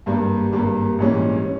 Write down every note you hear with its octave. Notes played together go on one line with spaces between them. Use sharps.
G#1 G2 G3 A#3
G#1 G2 G3 A#3
A#1 G#2 E3 G3 C#4
C#4